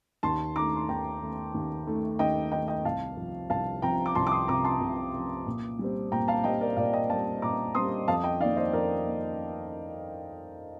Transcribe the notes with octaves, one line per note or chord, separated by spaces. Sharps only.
D#2 A5 C6
D#3 A3 A#5 D6
C6
D#2 G5 A#5
D#3 A3
D#2
D#3 A3
D#2 D#5 G5
D#3 A3 D#5 G5
D#5 G5
C2 F5 A5
C3 F3
C2 F5 A5
C3 F3 G5 A#5
D6
C2 A5 C6
D6
C6 D#6
C3 F3 A#5 D6
A5 C6
C2
C3 F3
A#2
G3 C4
A#2 G5 A#5
F5 A5
G3 C4 D#5 G5
A#4 D5
A#2 D5 F5
D#5 G5
G3 C4 F5 A5
A#2 A#5 D6
G3 C4 C6 D#6
F2 F5 A5
D#5 G5
D#3 A#3 D5 F5
C5 D#5
F2 A#4 D5
D#3 A#3